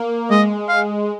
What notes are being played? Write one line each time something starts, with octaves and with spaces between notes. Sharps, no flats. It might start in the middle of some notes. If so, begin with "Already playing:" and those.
Already playing: A#3
G#3 D#5
F5